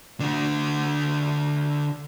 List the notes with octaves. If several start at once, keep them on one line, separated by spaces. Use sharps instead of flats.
D3 F#4